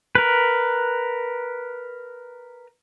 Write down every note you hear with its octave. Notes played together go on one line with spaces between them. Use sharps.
A#4 B4